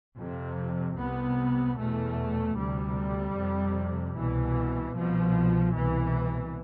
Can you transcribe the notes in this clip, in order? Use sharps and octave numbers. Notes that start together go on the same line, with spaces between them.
F2 C3
C2 C3 B3
E2 B2 A3
D2 C3 G3
F2 C3
C2 B2 E3
C2 B2 F3
C2 B2 E3